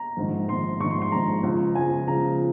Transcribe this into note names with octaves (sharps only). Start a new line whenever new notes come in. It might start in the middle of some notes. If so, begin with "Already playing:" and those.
Already playing: A#5
A#1 G#2 D#3
A#1 G#2 D#3 C6
A#1 G#2 D#3 C#6
C6
C6
A#1 G#2 D#3 A#5
C#2 C#3 F3
C#2 C#3 F3 G#5
C#2 C#3 F3 A#5